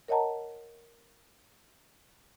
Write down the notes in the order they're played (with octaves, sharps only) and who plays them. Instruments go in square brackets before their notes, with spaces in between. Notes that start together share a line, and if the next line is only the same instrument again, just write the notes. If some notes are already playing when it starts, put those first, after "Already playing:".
[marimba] A#4 C#5 D#5 F#5 A5 A#5